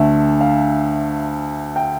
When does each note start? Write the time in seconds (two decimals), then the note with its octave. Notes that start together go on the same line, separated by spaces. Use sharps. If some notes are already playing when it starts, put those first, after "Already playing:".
Already playing: D2 D3 A3 E5
0.41 F5
1.76 G5